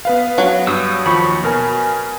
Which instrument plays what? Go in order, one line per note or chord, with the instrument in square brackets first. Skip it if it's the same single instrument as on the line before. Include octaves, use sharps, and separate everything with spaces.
[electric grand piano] B3 B4 F5
[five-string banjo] F#3
[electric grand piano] G2 [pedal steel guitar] D#6 E6
[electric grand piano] D#2 F3 C#6 [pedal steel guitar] B5
[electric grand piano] B2 A#4 G#5